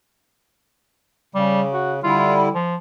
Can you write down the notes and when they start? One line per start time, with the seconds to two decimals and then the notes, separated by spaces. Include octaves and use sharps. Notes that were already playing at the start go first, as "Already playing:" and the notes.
1.35 C#3 G3
1.73 F#4
2.04 D3 G3 E4 F4
2.54 F3